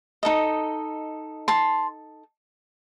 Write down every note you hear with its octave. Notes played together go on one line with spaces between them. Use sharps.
D#4 A4 D#5
A5 C6